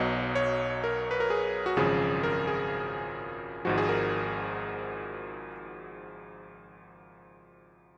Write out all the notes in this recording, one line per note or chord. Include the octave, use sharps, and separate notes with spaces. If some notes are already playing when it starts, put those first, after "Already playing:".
Already playing: B1 B2 F#3 D#5
C#5
A#4
B4
A#4
G#4
F#4
G#1 F#2 C#3 F3 G#4
A#4
G#4
G#1 G#2 F3 F#4
G#4
A#4